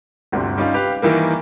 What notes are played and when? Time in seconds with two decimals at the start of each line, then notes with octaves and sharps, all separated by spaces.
0.32 G1 D2 C3
0.58 G3 C#4 D#4 F4
0.74 G4 B4 F5
1.02 D#3 E3 G3 A#3